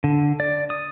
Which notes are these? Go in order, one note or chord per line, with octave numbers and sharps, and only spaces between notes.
D3
D5
D#6